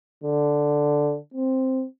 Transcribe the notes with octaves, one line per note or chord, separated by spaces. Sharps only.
D3
C4